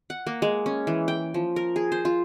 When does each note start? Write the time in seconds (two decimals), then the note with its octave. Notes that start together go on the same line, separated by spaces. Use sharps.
0.10 F#5
0.27 A#3
0.42 G#3
0.66 C#4
0.87 E3
1.08 G5
1.34 F3
1.56 A#4
1.76 G#4
1.92 C5
2.05 F4